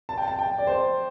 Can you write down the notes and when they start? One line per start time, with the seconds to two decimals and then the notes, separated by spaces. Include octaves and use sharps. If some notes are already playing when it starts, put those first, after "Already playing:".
0.09 A5
0.18 G5
0.28 A5
0.39 G5
0.58 D5
0.67 C5